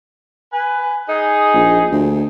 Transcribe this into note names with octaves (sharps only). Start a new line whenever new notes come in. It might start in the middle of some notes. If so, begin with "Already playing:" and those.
B4 G#5
D#4 G#4
A#1
D2